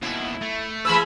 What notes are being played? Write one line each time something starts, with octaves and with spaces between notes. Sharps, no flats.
D#2 B2 E4
A3
E3 G#4 B4 B5 E6